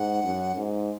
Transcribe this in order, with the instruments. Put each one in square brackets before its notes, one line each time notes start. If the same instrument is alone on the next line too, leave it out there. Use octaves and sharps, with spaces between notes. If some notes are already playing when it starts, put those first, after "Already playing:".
Already playing: [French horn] G#2 [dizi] F#5
[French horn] F#2
G#2